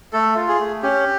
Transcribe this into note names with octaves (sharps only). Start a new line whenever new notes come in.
A3 A4
F4
G#4
A3
C#4 G4